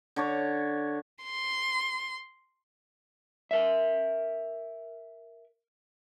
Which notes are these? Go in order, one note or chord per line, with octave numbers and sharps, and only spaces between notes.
D3 C#5 D6
C6
A#4 E5